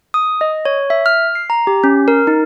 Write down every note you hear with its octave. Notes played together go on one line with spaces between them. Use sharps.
D#6
D#5
C#5
E5
F6
C7
A#5
G4
C#4
A#4
D#4